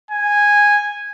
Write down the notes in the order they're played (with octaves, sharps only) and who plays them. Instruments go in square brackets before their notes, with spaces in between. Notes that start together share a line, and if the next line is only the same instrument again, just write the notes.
[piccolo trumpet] G#5